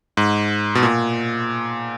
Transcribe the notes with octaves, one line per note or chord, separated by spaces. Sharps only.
G#2
B2
A#2